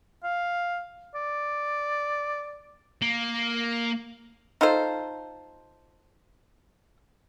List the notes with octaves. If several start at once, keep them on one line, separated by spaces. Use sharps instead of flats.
F5
D5
A#3
D#4 F4 A4 C5